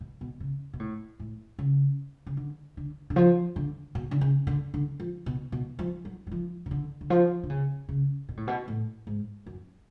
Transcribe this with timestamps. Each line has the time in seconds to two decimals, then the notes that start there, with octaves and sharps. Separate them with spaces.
0.01 B2
0.21 B2
0.40 C#3
0.73 B2
0.80 A2
1.19 A2
1.59 C#3
2.26 C#3
2.37 D3
2.77 D3
3.10 D3
3.16 F3
3.56 D3
3.95 B2
4.11 D3
4.21 C#3
4.47 D3
4.74 D3
5.00 F3
5.26 B2
5.52 B2
5.79 F3
6.05 F#3
6.27 F#3
6.31 F3
6.66 C#3
6.71 D3
7.01 D3
7.10 F3
7.44 D3
7.50 C#3
7.89 C#3
8.29 B2
8.37 A2
8.48 B2
8.68 A2
9.07 G#2
9.46 F#2